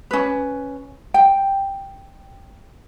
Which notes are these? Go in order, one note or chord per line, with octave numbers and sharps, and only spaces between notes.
C#4 B4
G5